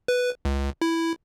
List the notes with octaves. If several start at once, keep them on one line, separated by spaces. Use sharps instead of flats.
B4
C#2
E4